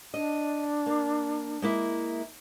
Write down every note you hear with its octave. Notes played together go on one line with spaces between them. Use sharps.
D4 D#5
A#3
G#3 A#3 E4